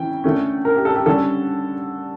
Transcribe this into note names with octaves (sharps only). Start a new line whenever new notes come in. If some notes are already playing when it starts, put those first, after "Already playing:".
Already playing: E3 C#4 G5
D3 A3 C#4
A#4
G4
A4
G4
D3 G3 C#4 A4